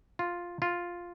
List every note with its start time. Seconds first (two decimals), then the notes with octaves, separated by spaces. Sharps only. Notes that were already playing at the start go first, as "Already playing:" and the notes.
0.19 F4
0.62 F4